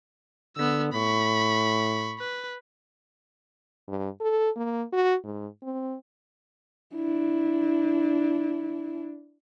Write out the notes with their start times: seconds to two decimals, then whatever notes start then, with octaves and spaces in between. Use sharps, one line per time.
0.57 D3 B3 E6
0.93 A2 B5 C#6
2.19 B4
3.88 G2
4.21 A4
4.57 A#3
4.93 F#4
5.24 G#2
5.63 C4
6.95 D4 E4